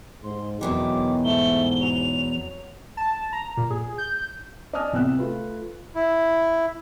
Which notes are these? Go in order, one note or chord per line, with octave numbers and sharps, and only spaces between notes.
G#2 C6
E2 B2 D#3 E3 F#3 D6
G#2 A3 G7
F#3 F7
A5
A#5
A#2
G#4
G6
D5 D#5 G#5 A5 D#6 F6
C2 C3 E6 F#6
A3 F4 B4
E4